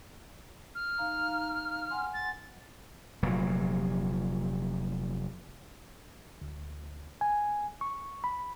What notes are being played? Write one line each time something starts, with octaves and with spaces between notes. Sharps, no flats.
F6
D#4 F5 A#5
F#5 G#5 C6
A6
F1 A#2 F#3
D2
G#5
C#6
B5